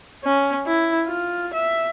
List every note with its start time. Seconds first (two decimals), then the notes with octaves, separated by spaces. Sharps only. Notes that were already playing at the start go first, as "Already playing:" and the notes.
0.24 C#4
0.67 E4
1.08 F4
1.54 E5